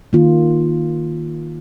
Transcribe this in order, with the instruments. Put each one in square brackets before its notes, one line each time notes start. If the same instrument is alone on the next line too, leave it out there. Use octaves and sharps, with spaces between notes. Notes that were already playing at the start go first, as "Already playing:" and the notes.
[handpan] D#3 A#3 F4